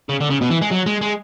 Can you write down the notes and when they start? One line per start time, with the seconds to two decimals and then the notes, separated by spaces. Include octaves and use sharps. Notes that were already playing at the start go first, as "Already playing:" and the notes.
0.09 C#3
0.21 D3
0.30 C#3
0.41 B2
0.50 E3
0.61 G#3
0.71 F#3
0.86 G#3
1.01 G#3